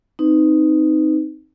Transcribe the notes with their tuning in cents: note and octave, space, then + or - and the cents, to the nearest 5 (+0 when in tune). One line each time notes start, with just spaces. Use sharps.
C4 +0 D#4 +0 B4 +25